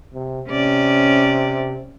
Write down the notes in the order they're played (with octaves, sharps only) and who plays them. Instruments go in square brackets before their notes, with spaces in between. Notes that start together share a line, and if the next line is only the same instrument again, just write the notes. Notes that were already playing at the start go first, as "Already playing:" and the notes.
[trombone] C3
[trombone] C3 [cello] C#4 D5